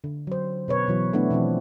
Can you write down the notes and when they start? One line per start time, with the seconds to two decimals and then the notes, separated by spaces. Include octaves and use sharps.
0.04 D3
0.27 F#3 C5
0.68 B2 B4 C#5
0.87 B2 E3 F#3
1.13 A3 B3 D4 E4
1.30 B2 E3 F3 C4